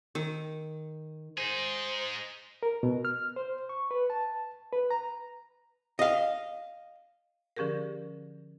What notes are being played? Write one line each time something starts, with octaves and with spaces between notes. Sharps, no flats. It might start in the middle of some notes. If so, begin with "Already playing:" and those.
D#3
D#4 G#4 C5
A#4
B2
F6
C5
C#6
B4
A5
B4
A#5
D#5 F5
D3 F3 C#4 G4 G#4 A#4